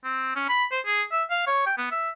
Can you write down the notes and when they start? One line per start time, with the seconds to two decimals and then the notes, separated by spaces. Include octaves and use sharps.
0.04 C4
0.36 C#4
0.49 B5
0.72 C5
0.86 G#4
1.11 E5
1.30 F5
1.47 C#5
1.66 G5
1.78 B3
1.91 E5